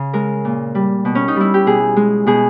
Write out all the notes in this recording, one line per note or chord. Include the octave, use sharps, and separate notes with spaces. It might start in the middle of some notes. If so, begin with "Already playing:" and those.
Already playing: C#3
G#3 A#4
A#2
G3
B2
C#4
D#4
G3 E4
G4
B2 G#4
G#3
B2 G#4